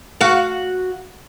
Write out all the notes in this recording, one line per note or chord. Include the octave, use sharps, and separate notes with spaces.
F#4 F5